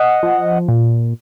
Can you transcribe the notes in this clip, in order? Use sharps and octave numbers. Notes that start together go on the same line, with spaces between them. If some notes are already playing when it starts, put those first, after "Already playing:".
Already playing: D#5 F#5
F3
A#2